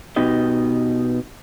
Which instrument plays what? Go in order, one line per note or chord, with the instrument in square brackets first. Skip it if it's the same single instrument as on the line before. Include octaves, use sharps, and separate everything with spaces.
[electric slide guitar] B2 D#4 G4 D#5